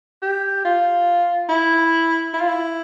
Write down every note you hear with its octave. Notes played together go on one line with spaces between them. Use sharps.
G4
F4
E4
E4
F4
E4